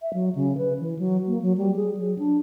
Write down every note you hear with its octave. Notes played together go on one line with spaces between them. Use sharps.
E5
F#3
C#3
B4
E3
F#3
A#3
F#3
G3
G#4
F#3
D4